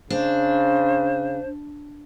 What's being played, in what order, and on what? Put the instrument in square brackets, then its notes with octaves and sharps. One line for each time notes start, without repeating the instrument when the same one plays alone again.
[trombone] C#3 [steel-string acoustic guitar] D4 [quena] C5